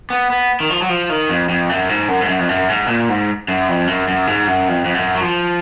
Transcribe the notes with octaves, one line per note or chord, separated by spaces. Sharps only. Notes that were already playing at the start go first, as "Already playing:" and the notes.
B3
B3
D#3
F3
F#3
F3
D#3
F2
F2
F#2
G#2
F#2
G#2
F#2
F2
F#2
G#2
A#2
G#2
F#2
F2
F#2
F#2
G#2
F#2
F2
F2
F#2
F#3
F3